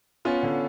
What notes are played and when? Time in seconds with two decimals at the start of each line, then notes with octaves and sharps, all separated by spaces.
0.25 B3 C#4 F4
0.43 D3